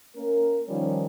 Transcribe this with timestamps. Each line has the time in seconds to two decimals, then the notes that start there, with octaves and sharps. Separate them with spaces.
0.16 A#3 C#4 A#4
0.68 D#3 F3 G3 C#4 F4